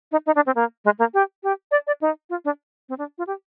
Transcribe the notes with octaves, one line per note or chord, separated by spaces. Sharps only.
D#4
D#4
D4
C4
A#3
G#3
A#3
G4
G4
D5
D5
D#4
F4
D4
C4
D4
F4
G4